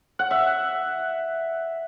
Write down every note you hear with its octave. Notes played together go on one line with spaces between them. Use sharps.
F#5
E5